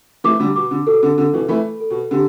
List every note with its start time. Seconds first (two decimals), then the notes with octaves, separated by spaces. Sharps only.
0.24 E3 A3 D6
0.40 D3 G3
0.56 B2 D6
0.71 D3
0.87 B2 A4
1.03 D3
1.18 D3 A4
1.33 B2 E3
1.48 E3 A3 B5
1.80 A4
1.90 B2
2.11 D3 G4